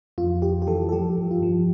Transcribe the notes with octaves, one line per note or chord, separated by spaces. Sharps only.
F2 F4
F2 G4
G4
E3 A4
A4
F3 G4
G2
F4
F3